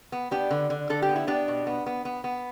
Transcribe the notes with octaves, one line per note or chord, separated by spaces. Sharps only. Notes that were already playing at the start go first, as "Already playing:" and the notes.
B3
B3 D4 G4
D3
D3
D3 A4
G4
B3
E4
B3 D4 G4
B2
B3
B3
B3
B3